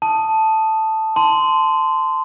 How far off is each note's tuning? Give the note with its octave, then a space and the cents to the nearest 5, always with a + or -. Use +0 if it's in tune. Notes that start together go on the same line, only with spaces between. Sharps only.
A5 +0 D#6 +0
A5 +0 C6 -15